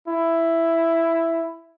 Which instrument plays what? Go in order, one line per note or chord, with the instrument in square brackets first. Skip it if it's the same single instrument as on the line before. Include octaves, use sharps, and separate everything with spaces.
[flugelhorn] E4